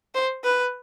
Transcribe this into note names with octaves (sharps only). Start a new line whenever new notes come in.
C5
B4